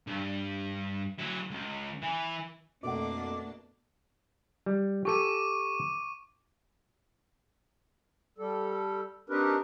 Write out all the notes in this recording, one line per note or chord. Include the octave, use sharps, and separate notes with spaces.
G2
F#3 E4
C#2
E3
F2 B2 A3 A#3 D4 F#5 D6
G3
G4 A4 C#6 D6 D#7
G3 A4
C4 D4 D#4 G4 A#4 B4